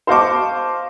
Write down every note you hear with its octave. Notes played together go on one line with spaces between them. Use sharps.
C5 D#5 F5 A5 C#6 D6